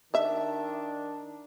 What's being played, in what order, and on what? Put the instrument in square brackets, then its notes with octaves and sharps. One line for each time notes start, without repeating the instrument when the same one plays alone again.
[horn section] D#3 D4 [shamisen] D#5 E5